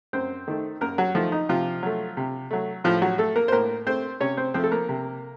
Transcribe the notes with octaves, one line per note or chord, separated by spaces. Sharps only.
F#2 C4 C5
D#3 A3
F#2 A#3 A#4
F#3 F#4
D#3 F3 A3 F4
D#4
C3 F3 F4
F#3 A3
C3
F#3 A3
A2 F3 F4
F#3 F#4
A3 A4
A#3 A#4
C5
A2 A#3 A#4
A3 C4 C5
C3 C#4 C#5
C4 C5
F3 A3 C4 C5
A4
A#3 A#4
C3